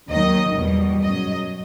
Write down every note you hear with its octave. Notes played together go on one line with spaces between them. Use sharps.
D#2 D#3 F#3 D#5
E2 B2 G3
F#2 F#3 D#5